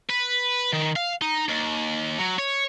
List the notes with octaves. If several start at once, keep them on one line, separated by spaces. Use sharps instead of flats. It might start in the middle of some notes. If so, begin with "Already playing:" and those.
B4
D#3
F5
D#4
D#2
F#3
C#5